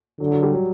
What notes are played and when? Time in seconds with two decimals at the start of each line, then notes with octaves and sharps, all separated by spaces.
0.20 D3 F#3
0.31 F#3
0.43 G3
0.54 F#3